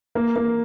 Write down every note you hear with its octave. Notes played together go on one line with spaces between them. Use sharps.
A#3
A#3